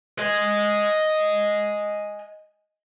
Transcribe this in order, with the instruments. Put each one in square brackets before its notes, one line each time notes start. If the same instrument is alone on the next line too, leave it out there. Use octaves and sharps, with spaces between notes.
[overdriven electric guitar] D#5 G#5